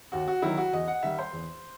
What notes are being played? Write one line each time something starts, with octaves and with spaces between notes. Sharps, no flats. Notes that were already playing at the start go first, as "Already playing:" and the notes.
D#2 F#4
F#4
D#3 F#3 E4
F#4
E2 D#5
F#5
D#3 G3 E5
C5
E2